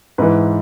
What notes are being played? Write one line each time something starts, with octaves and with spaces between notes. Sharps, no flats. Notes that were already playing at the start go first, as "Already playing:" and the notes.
G#2 E3 B4